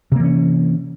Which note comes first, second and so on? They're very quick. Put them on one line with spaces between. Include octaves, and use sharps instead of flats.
C3 A#3 E3 C#4